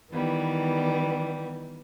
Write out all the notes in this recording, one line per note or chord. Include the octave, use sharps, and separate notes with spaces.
D#3 E3 G3 B3